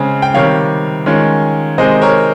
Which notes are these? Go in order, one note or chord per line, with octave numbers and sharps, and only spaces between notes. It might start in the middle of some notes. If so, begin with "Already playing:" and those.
Already playing: C#3 G#3 C4
G5
C3 D#3 G3 C#5 F5
D#3 G#3 C#4 F4
C3 D#3 G#3 C4 C5 D#5
A#4 C#5